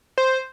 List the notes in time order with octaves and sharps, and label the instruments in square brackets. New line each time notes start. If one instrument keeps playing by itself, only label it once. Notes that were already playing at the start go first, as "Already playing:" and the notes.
[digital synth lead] C5